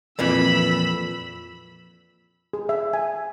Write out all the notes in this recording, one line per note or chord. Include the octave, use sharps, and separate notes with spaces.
F2 A#2 E3 B5 E6
G#4
E5
G#5